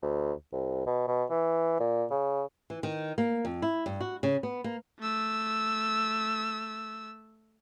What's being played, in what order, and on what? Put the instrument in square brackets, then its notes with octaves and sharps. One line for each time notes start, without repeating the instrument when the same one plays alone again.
[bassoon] D2
C2
B2
B2
E3
A#2
C#3
[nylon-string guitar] E3
D#3
A#3
F2
E4
G2
F#4
C#3
B3
A#3
[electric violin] A3 E6